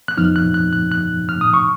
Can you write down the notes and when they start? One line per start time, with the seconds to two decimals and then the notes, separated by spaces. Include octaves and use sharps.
0.08 F#6
0.17 F2 F3 B3 D#4 F6
0.36 F#6
0.54 F#6
0.73 F#6
0.92 F#6
1.29 F6
1.41 D#6
1.54 C#6